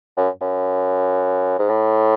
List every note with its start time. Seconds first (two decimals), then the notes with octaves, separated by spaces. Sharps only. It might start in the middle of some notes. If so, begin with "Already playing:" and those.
0.17 F#2
0.41 F#2
1.59 G#2
1.70 A2